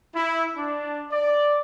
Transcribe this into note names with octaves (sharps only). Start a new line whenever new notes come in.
E4
D4
D5